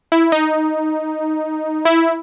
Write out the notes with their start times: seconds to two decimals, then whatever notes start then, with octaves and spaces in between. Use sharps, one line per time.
0.12 E4
0.32 D#4
1.85 E4